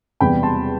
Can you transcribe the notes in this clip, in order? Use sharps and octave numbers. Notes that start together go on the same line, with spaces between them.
E1 E2 C3 G3 B3 G5 B5
A5 C6